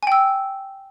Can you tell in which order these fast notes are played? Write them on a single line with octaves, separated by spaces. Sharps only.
G#5 G5 E6